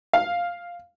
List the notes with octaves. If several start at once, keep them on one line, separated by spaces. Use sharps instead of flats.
F5